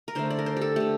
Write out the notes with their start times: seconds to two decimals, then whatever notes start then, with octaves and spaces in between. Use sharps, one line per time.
0.08 A#4
0.15 D3 A3 C5
0.30 D5
0.39 A#4
0.46 C5
0.57 G4 A4
0.76 D3 A3 G4